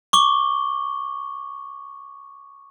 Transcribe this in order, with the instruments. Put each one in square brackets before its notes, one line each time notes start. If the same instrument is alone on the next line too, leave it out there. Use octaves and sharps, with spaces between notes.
[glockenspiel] C#6 D6 G7